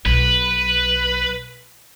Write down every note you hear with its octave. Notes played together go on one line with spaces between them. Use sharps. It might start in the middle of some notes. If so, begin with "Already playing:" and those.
B1 B4